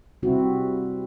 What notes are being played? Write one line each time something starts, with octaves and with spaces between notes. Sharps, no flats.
C3 G3 C4 E4 F#4